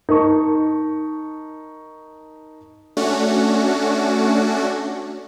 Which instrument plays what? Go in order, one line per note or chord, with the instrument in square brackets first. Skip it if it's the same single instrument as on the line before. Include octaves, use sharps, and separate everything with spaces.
[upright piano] D#4 A#4 A5 C#6
[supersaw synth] A3 C#4 D4 F#4